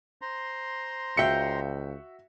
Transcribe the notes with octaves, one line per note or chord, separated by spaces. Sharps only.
C5 A#5 C6
C#2 F#4 E5 F5 G5 C#7